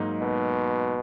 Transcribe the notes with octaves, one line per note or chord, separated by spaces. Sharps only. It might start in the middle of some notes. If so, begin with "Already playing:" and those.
Already playing: G#2 F#3 A#3 D#4
B2